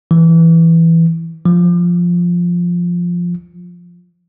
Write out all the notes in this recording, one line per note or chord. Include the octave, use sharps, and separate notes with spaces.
E3
F3